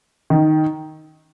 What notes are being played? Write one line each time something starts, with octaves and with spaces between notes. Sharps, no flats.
D#3